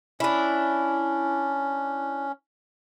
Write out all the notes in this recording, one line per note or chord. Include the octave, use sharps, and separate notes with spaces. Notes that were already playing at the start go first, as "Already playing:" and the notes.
C#4 D4 E4